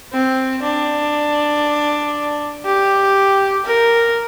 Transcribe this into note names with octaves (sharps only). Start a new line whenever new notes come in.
C4
D4
G4
A#4